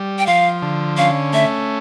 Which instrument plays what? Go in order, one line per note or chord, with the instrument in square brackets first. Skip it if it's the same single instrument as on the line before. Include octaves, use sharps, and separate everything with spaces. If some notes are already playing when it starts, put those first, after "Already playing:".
Already playing: [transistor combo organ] G3
[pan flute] G5
[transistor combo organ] F3 [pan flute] F5
[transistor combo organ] D3
[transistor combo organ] C#4 [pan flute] F5
[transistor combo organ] A3 [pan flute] E5